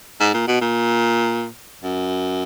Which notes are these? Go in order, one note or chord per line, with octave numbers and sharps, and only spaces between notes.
G#2
A#2
B2
A#2
F#2